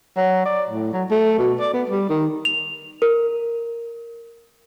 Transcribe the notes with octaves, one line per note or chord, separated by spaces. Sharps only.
F#3
D5
A2
F#3
A3
B2
D5
B3
G3
D#3
F7
A#4